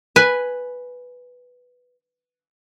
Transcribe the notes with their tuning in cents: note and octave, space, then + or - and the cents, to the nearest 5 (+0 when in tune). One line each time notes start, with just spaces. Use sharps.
B4 +0 G#5 +0